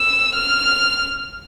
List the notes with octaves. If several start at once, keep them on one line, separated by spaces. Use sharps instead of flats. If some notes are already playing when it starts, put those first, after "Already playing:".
Already playing: E6
F6